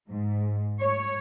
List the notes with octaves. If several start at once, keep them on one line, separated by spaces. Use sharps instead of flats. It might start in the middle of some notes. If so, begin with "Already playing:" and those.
G#2
C#5